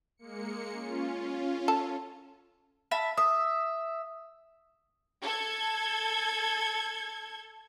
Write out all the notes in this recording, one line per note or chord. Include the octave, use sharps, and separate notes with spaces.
G#3 A#3 C#7
C#4 F4
A4
E5 A5 B5
E5 D#6
A4 G#6